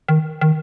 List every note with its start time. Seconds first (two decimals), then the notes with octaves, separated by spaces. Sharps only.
0.08 D#3
0.41 D#3